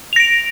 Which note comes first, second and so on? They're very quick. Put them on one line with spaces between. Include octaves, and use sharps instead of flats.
F7 A#6 D7